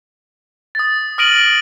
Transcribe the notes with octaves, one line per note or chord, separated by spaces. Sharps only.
D#6 A6
D#6 F6 A#6 D7 D#7 F#7